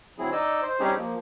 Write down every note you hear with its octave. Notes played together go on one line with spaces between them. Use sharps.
D2 F#3 C4 E4 G#4
D#4 D5 D#5 E6
C5
G3 C4 C#4 D#4 G4 G#4
F3 A#3